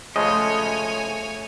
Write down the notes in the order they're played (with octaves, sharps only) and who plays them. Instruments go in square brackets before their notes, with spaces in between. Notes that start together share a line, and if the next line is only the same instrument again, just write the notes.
[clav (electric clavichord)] C#3 F3 G#3 [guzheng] A3 [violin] C#5 G#5 [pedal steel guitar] D#5